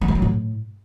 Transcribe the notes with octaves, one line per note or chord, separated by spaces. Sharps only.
G3
G2
F#3
A2